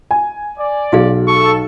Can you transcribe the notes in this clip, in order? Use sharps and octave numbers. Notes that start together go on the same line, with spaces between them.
G#5
D5
B1 F#4 G#4 F5
A4 C#6